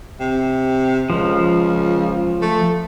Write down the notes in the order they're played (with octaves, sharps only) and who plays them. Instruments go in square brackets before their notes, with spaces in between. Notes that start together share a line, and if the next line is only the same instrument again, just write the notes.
[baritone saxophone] C3
[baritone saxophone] C#2 [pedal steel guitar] F3
[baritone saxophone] A3